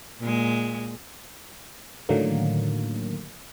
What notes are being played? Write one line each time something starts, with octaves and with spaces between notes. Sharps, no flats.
A#2 G#3
A2 D3 D#3 F#3 A#3